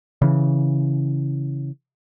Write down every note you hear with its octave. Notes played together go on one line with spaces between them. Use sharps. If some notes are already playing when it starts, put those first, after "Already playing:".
C#3 E3